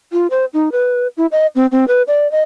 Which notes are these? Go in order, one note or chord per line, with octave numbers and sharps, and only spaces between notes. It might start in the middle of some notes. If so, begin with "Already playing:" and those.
F4
C5
D#4
B4
E4
D#5
C4
C4
B4
D5
D#5